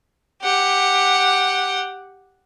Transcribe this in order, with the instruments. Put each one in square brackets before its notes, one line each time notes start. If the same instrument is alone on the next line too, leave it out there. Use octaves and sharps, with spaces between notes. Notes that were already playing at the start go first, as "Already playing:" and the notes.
[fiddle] G4 F#5